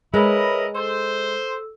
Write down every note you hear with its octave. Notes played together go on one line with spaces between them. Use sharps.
G#3 E4 A#4 B4 C#5 D#5 B5
A4 C5 E6